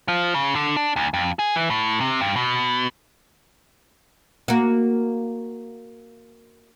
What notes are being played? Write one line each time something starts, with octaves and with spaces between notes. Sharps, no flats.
F3
C#3
D3
D4
D2
F2
G#4
E3
A2
C3
G2
B2
A#3 F#4